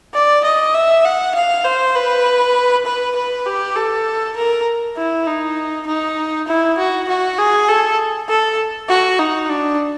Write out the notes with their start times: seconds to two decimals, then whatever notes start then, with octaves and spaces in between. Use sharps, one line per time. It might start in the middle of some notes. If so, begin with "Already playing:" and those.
0.14 D5
0.44 D#5
0.74 E5
1.05 F#5
1.35 F5
1.65 C5
1.95 B4
2.86 B4
3.16 B4
3.46 G4
3.76 A4
4.36 A#4
4.97 E4
5.27 D#4
5.87 D#4
6.48 E4
6.78 F#4
7.08 F#4
7.38 G#4
7.68 A4
8.29 A4
8.89 F#4
9.19 D#4
9.50 D4